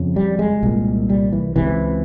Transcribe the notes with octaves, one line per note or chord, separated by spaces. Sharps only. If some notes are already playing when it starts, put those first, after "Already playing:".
Already playing: F2 C#3
G3
G#3
C2 A#2
G3
E3
C#2 C3 E3